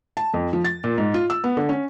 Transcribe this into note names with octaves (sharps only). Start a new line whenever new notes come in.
A5
F2
F3
A6
A#2
G#2
F4
E6
B3
D3
C#4